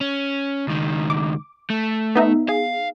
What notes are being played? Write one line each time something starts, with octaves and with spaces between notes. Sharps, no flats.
C#4
C#2 D#3
D6
A3
B3 D#4 E5
G#4 F5